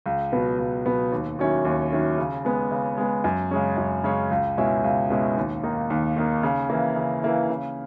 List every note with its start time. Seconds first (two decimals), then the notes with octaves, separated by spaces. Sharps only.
0.06 C#2
0.32 B2 F#3 B3
0.59 C#2
0.86 B2 F#3 B3
1.12 D#2
1.39 D#3 F#3 C#4 E4
1.65 D#2
1.92 D#3 F#3 C#4 E4
2.18 C#3
2.45 G#3 B3
2.71 C#3
2.98 G#3 B3
3.24 F#2
3.51 C#3 G#3 C#4
3.77 F#2
4.04 C#3 G#3 C#4
4.31 C#2
4.58 B2 G#3 C#4 E4
4.84 C#2
5.10 B2 G#3 C#4 E4
5.37 D#2
5.63 D#3 A#3 D#4
5.90 D#2
6.16 D#3 A#3 D#4
6.43 C#3
6.70 E3 A#3 E4
6.96 C#3
7.23 E3 A#3 E4
7.49 C#3